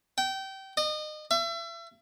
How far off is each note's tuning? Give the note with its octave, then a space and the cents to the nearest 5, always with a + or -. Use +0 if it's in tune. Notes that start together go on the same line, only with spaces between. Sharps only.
G5 -25
D#5 -30
E5 +35